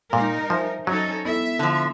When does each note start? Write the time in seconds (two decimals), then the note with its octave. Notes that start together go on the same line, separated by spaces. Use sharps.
0.13 A#2 G3 D#4 A#4
0.50 F3 C5 E5 G#5
0.87 F#3 C#4 D#4 A4
1.25 B3 E4 A4 E5
1.59 D3 F3